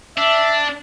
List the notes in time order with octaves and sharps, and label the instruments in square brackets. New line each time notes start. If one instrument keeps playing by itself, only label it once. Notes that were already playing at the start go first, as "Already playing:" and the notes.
[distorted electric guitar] D4 [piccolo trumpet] E5